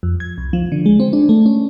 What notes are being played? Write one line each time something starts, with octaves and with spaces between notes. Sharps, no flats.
F2
G#6
C2
F3
D3
G#3
C4
D4
A3
C#4